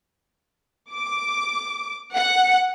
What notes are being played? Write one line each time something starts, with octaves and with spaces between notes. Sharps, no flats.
D6
F#5